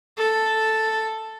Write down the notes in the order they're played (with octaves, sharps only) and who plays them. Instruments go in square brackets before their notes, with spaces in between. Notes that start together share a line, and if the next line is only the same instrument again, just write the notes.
[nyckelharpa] A4